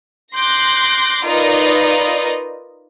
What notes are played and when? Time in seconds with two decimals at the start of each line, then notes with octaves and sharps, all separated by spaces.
0.36 C6 D6 F#6 G6 A#6
1.24 D#4 F4 A#4 B4 D5 D#5